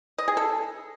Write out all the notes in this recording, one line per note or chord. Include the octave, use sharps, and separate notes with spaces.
D#5
G#4
A4